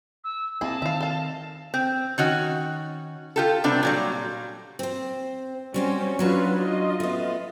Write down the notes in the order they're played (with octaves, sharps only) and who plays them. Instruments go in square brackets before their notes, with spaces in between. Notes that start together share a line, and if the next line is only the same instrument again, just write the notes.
[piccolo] E6
[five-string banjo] A#3 E4 G#4 [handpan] C4 D#5 [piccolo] A5
[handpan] D#3 [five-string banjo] E5 F5
[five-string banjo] A4 F5
[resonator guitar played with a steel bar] C4
D#3 C#4 F#4
F4 G4 A4
C3 G3 B3 C4 D4
A#2 F#3 G3
[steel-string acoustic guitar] C4 C5
[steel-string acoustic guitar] G3 C4 F#4 [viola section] C#4 C5
[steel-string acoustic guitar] F#3 C#4 D4 [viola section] F4 F#4 B4
[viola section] F4 D#5
[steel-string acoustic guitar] A3 B3